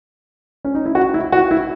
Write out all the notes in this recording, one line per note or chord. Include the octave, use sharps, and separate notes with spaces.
C#4
D#4
E4
F#4
E4
F#4
E4